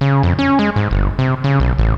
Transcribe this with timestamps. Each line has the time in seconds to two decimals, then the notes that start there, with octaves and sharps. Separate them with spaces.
0.01 C#3
0.23 F2
0.39 C#4
0.59 G#3
0.76 G#2
0.91 G1
1.19 C3
1.44 C#3
1.60 B1
1.78 A1